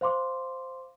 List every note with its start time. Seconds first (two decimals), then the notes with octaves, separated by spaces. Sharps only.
0.01 C5 F5 C6 D6